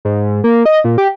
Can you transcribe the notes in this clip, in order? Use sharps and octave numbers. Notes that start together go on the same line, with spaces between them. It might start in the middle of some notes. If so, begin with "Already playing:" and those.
G#2
A#3
D#5
A#2
G4